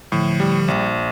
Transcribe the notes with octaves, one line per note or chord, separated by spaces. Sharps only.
A2 D3 F3
G3
A#1